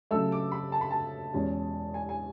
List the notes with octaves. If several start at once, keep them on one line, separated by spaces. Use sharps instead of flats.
C#3 F#3 A3 E6
D6
B5
A5
B5
A5
E2 B2 G#3 C#4
G#5
G#5